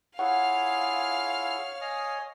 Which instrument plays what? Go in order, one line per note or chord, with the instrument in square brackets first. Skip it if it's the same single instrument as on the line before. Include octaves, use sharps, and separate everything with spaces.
[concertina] E4 F4 G#4 [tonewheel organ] C#5 [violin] F5 F6 [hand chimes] F#5
[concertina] D#5 G#5 D#6